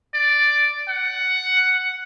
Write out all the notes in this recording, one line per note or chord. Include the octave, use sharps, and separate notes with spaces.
D5
F#5